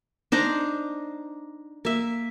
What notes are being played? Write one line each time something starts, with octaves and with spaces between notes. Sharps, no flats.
D4 D#4 C5 A#5
A#3 E5